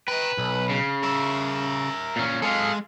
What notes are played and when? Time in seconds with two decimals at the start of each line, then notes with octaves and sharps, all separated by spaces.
0.08 B4 G5 A#5
0.38 B1
0.69 C#3
1.03 A#4 E5
2.16 A#2 C#4
2.42 G#3 A4 F5